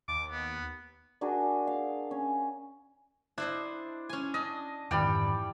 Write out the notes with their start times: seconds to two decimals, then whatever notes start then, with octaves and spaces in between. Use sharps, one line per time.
0.08 D#2 D6
0.32 B3
1.21 D4 F#4 G#4 A#4
1.67 F5
2.11 C#4
3.38 D4 E4 C5 D#5
4.09 C#4 G#5
4.34 D4 D#5
4.91 F2 G#2 D#3 E3 G3 D5 G5